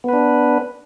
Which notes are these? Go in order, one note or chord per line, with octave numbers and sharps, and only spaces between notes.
B3 D4 B4